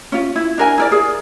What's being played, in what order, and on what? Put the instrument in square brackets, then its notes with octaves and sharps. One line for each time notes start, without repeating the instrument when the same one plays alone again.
[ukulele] C#4 F4
E4
D4 A#4 G#5
E4 A#4 D5
G#4